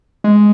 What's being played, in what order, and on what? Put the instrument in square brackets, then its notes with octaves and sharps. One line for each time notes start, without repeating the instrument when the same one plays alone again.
[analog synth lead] G#3